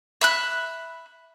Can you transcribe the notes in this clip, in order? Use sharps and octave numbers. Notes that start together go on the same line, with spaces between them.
E5 B5 F#6